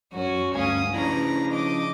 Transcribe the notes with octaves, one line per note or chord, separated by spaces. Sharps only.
F#2 F#3 C#4 F#4
D2 G2 C#4 F5 G#5 D#6
C#3 F3 C#4 D4 E4 B4 A#5
D#5 D6